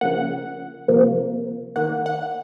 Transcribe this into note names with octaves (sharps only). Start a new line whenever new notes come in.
C#3 F3 A#3 F#5
C3 F3 A#3
D#3 A#3 F#5
F#5